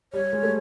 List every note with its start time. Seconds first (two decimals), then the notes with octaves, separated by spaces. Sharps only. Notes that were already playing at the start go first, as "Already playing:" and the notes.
0.13 G3 C#5
0.33 G#3
0.42 G3 A3